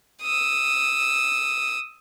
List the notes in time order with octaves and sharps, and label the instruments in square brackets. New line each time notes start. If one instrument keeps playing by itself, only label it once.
[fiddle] D#6 E6